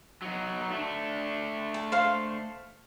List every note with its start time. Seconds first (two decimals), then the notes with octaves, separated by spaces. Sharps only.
0.22 F#3 D#4
0.71 A3 D4
1.74 A5
1.92 C5 F5